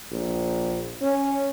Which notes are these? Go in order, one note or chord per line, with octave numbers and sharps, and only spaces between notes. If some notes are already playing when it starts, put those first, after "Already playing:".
A#1
C#4